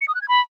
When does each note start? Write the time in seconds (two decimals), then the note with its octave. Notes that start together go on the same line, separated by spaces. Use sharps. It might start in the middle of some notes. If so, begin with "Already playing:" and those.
0.01 C#7
0.08 D#6
0.15 F#6
0.22 G#6
0.28 B5